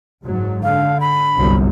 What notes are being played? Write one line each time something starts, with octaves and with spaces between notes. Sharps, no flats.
F#1 G#2 F#3
D3 F5
B5
G1 C2 F#2